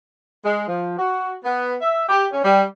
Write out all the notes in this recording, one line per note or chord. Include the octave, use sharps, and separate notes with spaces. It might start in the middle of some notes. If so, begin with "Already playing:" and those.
G#3
F3
F#4
B3
E5
G4
C#4
G3